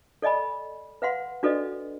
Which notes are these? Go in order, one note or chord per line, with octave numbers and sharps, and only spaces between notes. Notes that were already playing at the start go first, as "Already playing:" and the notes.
A4 D5 D#5 G#5 B5
B4 F5 F#5 C6
D4 F#4 A4 B4 D5 D#5